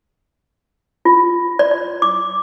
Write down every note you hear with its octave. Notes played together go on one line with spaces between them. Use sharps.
F4
D5
D5
D6